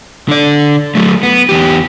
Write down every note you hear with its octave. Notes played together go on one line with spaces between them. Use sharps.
D3 D5
F#3 A3
B3
E2 G4